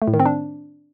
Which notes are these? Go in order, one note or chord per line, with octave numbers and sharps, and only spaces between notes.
A3
A2
D#3
C4
D4